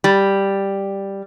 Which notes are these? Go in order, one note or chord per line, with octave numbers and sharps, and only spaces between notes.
G3